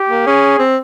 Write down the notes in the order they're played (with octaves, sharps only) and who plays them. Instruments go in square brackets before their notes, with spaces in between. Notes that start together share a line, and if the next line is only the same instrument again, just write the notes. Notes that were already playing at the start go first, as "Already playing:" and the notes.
Already playing: [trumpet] G4
[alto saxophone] A#3
[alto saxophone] C#4 [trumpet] G#4
[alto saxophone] C4